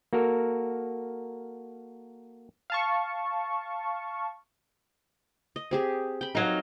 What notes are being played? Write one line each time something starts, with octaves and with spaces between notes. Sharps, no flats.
A#3 F#4 A4 A#4
F5 A5 C#6
D#5
C4 G4 G#4
G5 B5
F2 F#3 D#4 A#4 F5